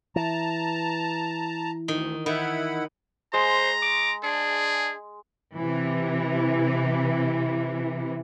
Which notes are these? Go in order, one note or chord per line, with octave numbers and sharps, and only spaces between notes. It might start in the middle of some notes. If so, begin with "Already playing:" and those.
E3 A5 A#5
D2 D#3
D#3 E4 F#5 B5
G#3 C5 A#5
D6
D4 G#4
C3 E3